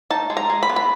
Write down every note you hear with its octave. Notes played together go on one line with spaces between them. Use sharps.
D#4 A5
G#3
A#5
G#3
B5
B3
B5